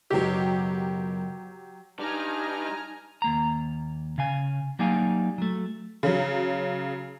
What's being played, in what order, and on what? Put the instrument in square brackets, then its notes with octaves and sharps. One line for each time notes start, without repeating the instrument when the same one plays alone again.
[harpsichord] C#2 F#2 B2 [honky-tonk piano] F#3 G4
[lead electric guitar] G3 D4 [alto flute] D#4 [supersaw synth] G#5 A#5 F6
[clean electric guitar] D#2 A#3 A#5
C#3 F5 G#5
F#3 G3 A#3 D#4 F5 G#5
F#3 A3
[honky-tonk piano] C#3 F#3